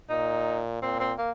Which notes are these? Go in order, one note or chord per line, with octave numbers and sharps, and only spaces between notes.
A#2 D#4
A#2 C4
C4
A#3